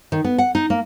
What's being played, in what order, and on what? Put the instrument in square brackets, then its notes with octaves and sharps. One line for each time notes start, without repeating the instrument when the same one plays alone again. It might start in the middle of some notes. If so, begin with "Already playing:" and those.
[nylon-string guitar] D#3
B3
F#5
D#4
A#3